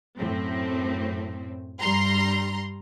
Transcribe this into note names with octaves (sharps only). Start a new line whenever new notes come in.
F#2 A2 C4
G2 G3 A#5 C6